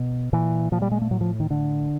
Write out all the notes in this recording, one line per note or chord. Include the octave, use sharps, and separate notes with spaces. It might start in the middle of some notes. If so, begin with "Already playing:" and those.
Already playing: B2
A#2 E3
A#2 F3
G3
G#3
A3
A2 F#3
F3
D#3
A2 D3